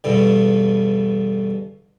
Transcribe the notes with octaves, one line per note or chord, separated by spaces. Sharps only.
E2 G2 B2 D3